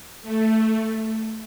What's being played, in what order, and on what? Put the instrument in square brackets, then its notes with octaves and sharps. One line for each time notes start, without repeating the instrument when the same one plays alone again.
[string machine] A3